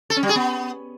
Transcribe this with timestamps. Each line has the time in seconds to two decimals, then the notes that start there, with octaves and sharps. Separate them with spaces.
0.10 A4
0.16 C#4
0.23 G3
0.29 G#4
0.36 B3